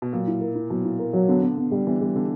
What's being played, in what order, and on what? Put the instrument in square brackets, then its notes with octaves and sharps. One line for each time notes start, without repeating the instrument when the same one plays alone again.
[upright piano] B2
[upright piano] A#2 [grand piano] F#3
[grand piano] E4
A#4
E4
[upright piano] B2 [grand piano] F#3
[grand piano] E4
A#4
F#3
[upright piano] D3 [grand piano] B3
[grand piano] B3
B3
G3
[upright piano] E3 [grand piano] B3
[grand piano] G3
[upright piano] D3 [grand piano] B3